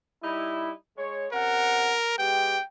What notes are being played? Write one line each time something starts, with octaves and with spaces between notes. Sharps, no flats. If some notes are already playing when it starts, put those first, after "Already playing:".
G3 D#4 E4
G#3 C#5
C3 C#4 A#4 F#5
G#3 B3 G4 G5